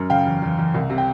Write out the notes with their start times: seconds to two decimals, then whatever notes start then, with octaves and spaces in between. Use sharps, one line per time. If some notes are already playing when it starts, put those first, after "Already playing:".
Already playing: F#2
0.10 C#3 F5 G5
0.26 E2
0.42 E2
0.58 E2
0.74 C2
0.90 C3
0.98 G5